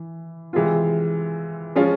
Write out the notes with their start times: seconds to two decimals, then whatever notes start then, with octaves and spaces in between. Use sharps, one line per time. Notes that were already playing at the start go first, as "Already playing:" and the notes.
Already playing: E3
0.53 C3 E3 G#3 C4 F4
1.75 F3 G#3 C#4 F4